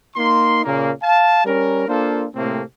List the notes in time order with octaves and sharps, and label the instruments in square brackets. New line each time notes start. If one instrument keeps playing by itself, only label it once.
[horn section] A#3 D#4 C6
A#2 C#3 A#3
F5 A5
G3 C#4 A#4
A#3 D4 F4 A4 C5
A2 C3 A3 A#3 C4